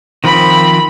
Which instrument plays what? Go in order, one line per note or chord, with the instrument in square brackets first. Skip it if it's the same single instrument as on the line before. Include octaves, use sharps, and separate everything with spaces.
[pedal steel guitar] D#3 F3 C4 [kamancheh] B5